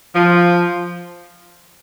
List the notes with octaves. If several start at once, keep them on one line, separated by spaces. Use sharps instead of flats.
F3